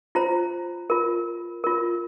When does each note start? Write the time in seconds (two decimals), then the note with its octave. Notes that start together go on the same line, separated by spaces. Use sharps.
0.15 F4 C5 A#5
0.90 F4 A#4
1.64 F4 A#4